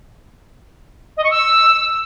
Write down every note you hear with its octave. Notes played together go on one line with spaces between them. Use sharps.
D#5
C#6
E6